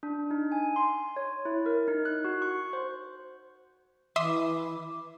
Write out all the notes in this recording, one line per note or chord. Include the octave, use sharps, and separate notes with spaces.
D4
D#4
G#5
C6
C#5
E4
A#4
D#4
F#6
F#4
C#6
C5
E3 E5 C6 D6 D#6